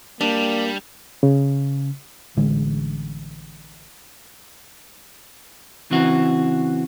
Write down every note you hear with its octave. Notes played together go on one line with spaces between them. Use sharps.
G3 A#3 D4
C#3
A1 D3 G#3
C#3 E3 C4 F#4